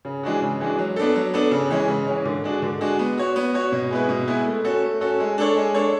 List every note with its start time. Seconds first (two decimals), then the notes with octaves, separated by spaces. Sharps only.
0.05 C#3
0.23 E3 G#3 D4 F#4
0.42 C#3
0.60 E3 G#3 D4 F#4
0.79 F#3
0.96 B3 D4 A4
1.15 F#3
1.34 B3 D4 A4
1.51 C#3
1.70 E3 G#3 C#4
1.88 C#3
2.07 E3 G#3 C#4
2.25 D3
2.44 G#3 D4 F#4
2.62 D3
2.81 G#3 D4 F#4
2.99 B3
3.18 F#4 C#5
3.36 B3
3.54 F#4 C#5
3.72 B2
3.91 G#3 B3 E4 B4
4.09 B2
4.27 G#3 B3 E4 B4
4.46 A3
4.64 C#4 F#4 A4
4.83 A3
5.01 C#4 F#4 A4
5.20 G#3
5.38 D4 A4 C#5
5.56 G#3
5.74 D4 A4 C#5